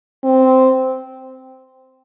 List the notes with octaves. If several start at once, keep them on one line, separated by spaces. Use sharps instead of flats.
C4